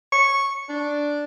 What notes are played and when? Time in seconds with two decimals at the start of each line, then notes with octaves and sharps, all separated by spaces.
0.12 C#6
0.69 D4